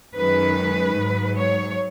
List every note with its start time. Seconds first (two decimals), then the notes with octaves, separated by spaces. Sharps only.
0.16 F#2 D#3 G#3 B4
0.96 G#2 F#3
1.37 C#5